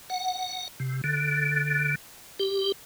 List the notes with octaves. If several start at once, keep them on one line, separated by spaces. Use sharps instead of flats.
F#5
C3
D3
G4